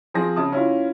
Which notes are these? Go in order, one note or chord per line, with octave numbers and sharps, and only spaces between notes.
F3 C4 G#4 A#6
C#3 E5 A5 D#6
C#4 E4 F4